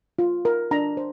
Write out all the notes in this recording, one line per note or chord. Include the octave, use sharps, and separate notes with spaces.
F4
A#4
D4 A#5
C5